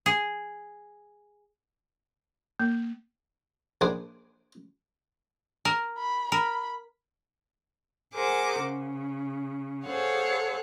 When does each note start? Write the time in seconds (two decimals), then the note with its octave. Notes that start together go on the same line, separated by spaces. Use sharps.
0.06 G#4
2.60 A#3
3.81 A#1 D4 G#4 C5 D6 D#6
5.65 A#4
5.98 B5
6.32 A#4 B5
8.14 G#4 A#4 C5 F#5 D6
8.60 C#3
9.85 G#4 A4 C5 C#5 F5 F#5